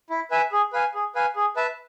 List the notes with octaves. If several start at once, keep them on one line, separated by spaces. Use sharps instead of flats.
E4
B4 E5 G#5
G#4
B4 F5 G#5
G#4
B4 F5 G#5
G#4
B4 E5 A5